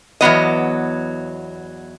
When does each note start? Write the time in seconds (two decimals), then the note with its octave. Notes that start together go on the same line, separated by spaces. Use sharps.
0.21 E2 F#3 B3 D#5